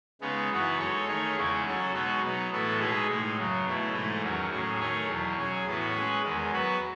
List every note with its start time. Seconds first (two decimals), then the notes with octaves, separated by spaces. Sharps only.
0.21 C#3 G#3 B3 D#4
0.50 F#2 E3 B3 D#4 F#4
0.79 G#3 D#4 A4 C#5
1.07 D#3 A3 D#4 G#4 C#5
1.36 E2 C#3 G#3 C#4 E4
1.65 F#3 C#4 F#4 A4
1.93 B2 G#3 B3 D#4 F#4
2.21 F#3 B3 D#4
2.51 A2 E3 B3 F#4 A4
2.78 B2 G#3 D#4 G#4 B4
3.08 A2 G#3 D#4
3.36 F#2 C#3 F#3
3.66 B2 A3 E4
3.93 G#2 E3 A3 D#4
4.22 E2 D#3 F#3 C#4
4.51 A2 F#3 C#4 G#4
4.79 D#3 A3 D#4 G#4 C#5
5.07 E2 B2 F#3
5.37 F#3 C#4 G#4
5.65 A2 E3 B3 F#4
5.94 G#3 C#4 G#4 B4
6.23 E2 D#3 G#3
6.51 F#3 B3 F#4 B4